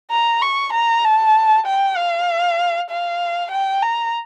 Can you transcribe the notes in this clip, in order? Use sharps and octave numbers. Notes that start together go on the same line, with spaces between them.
A#5
C#6
A#5
A5
G5
F5
F5
G5
A#5